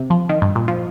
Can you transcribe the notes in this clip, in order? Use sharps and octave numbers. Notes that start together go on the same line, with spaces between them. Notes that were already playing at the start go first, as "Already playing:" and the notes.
Already playing: C3
F3
D#3
G2
A#2
F3